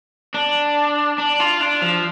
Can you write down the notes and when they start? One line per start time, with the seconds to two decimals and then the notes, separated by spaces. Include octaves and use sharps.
0.34 D4
1.18 D4
1.40 F4
1.61 D4
1.82 F3